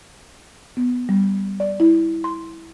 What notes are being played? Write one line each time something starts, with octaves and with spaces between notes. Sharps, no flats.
B3
G3
D5
E4
C6